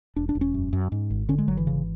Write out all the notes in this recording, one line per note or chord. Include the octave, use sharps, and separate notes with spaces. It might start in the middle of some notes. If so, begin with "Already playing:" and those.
E1 D4
D4
E1
C#4
F#2
F#2
G#2
G#1
D3 C#4
G#3
G#1 F#3
E3
C#3